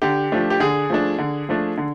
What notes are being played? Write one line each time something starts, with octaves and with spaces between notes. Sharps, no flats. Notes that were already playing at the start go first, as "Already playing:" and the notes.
D3 G4
F3 A3 D4
G4
D3 G#4
F3 A3 D4
D3
F3 A3 D4
D3